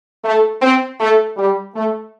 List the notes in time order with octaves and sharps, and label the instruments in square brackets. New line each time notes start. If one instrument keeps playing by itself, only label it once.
[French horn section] A3
C4
A3
G3
A3